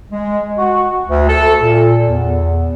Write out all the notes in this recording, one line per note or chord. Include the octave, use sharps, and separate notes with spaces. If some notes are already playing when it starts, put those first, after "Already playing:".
G#3
F#4
D2
A4
A#2
E2